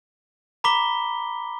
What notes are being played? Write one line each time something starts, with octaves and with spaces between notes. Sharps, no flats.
A#5 B5 D6 B6 G7